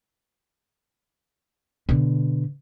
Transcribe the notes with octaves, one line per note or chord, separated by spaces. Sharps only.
B2 D3